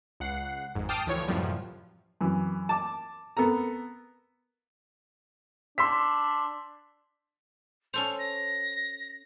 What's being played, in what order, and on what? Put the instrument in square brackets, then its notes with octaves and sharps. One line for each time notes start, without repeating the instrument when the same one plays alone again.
[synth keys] C#2 F#5 C7
G#1 F2 G#2
G5 A5 D6 D#6 F6 C7
D2 E3 F3 C#5
F#2 A2 C3 E3 F3 G3
[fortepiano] F#2 E3
A5 D6
B3 A4 A#4 A#5
[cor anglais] D4 [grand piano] C6 E6 B6
[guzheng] C#4 A4 C5 [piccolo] F7
[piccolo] A#6